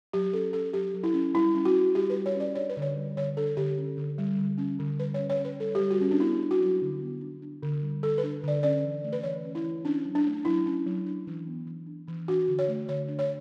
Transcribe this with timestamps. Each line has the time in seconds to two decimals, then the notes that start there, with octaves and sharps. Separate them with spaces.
0.13 F#3 G4
0.33 C#4 A4
0.53 C#4 A4
0.73 F#3 G4
0.94 F#3
1.04 E4
1.14 C#4
1.35 G3 E4
1.55 C#4
1.65 F#4
1.74 C#4
1.95 G3 G4
2.10 B4
2.15 G3
2.26 C#5
2.36 C#4 D5
2.55 D4 C#5
2.69 B4
2.77 D3
2.82 C#5
2.96 G3
3.17 D3 C#5
3.37 D4 A4
3.57 D3 G4
3.78 C#4
3.97 D3
4.18 G3
4.39 D3
4.58 C#4
4.79 D3
4.99 G3 B4
5.14 C#5
5.19 C#4
5.30 C#5
5.40 C#4 B4
5.60 G3 A4
5.75 G4
5.79 G3
5.91 F#4
6.01 C#4
6.11 D4
6.20 B3 E4
6.41 D4
6.51 F#4
6.61 F#3
6.82 D3
7.02 B3
7.21 D4
7.42 D4
7.63 D3
7.82 G3
8.03 D3 A4
8.18 B4
8.23 D4
8.43 D3 D5
8.63 C#4 D5
8.83 E3
9.04 A3
9.12 B4
9.23 E3 C#5
9.45 C#4
9.55 E4
9.64 E3
9.85 C#4 D4
10.05 F#3
10.15 D4
10.25 A3
10.45 F#3 E4
10.66 C#4
10.86 F#3
11.06 D4
11.27 E3
11.47 B3
11.67 E3
11.87 D4
12.08 E3
12.28 D4 F#4
12.48 D3
12.59 C#5
12.68 A3
12.88 D3 C#5
13.08 D4
13.19 C#5